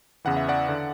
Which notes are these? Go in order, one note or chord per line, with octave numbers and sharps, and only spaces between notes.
E2 C#3 E3 F#5
E5
D5 F#5
D3